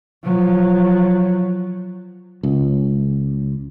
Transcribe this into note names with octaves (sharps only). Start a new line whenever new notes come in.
F3 F#3
C#2